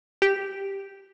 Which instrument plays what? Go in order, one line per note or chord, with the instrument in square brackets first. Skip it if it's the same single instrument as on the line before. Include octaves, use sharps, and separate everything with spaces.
[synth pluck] G4